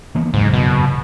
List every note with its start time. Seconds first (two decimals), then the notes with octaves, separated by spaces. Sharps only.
0.15 E3 A#3 B3
0.34 F#1 E2 G#2
0.54 B2